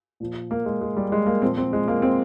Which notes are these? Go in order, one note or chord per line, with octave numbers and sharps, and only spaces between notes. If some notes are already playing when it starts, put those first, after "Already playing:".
A#2 F3
A#3
G#3
G#3
G3
G#3
A#3
A#2 F3 C4
C4
G#3
A#3
C4